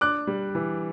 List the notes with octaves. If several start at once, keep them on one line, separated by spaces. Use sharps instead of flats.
D4 D6 F#6
G3
E3